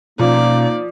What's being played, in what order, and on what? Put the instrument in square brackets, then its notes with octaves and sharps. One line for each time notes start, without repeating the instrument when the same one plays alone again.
[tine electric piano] B2 C#4 [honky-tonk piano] F3 [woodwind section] A#3 D#4 [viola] D5